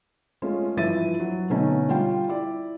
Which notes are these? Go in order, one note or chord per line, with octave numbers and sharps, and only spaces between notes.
G#3 A3 C#4 F4
G2 E3 F3 E5 A6 D#7
F#3
B2 D3 A3 C#4 D#4
G3 F4 G5
E4 D5